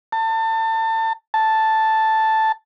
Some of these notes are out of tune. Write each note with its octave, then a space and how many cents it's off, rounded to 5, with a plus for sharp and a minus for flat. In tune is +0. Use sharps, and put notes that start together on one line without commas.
A5 +30
A5 +0